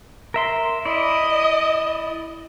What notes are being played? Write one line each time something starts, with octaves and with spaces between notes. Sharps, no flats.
A#4 E5 C6
E4 D5 D#5